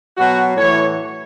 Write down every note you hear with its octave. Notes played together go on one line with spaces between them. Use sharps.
B2 F#3 F#4
A2 E3 C#5